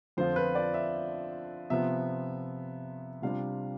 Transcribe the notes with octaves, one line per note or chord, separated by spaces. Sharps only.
F2 D3 F3 C4 F4 C5
B4
D5
E5
C3 F3 B3 E5
C3 G3 D4 F4 F5